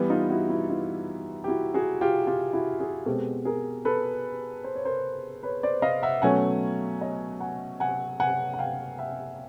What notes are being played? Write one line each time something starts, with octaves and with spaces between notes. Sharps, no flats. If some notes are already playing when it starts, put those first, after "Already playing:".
Already playing: E3 G3 B3
D#4 F4
E4 F#4
E4 F#4
D#4 F4
G4
E4 F#4
F#4 G#4
F4 G4
F4 G4
E4 F#4
F#4 G#4
B2 G#3 C4 G4 A4
G#4 A#4
A4 B4
C5
C#5
A#4 C5
B4 C#5
C5 D5
D#5 F5
E5 F#5
B2 F#3 A3 C#4 F#5 G#5
C#5 D#5
F#5 G#5
F#5 G#5
F#5 G#5
F#5
F5 G5
E5 F#5